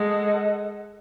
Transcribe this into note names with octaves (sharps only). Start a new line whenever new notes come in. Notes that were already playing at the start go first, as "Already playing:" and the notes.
Already playing: G#3 A4 D#5 F#5 A5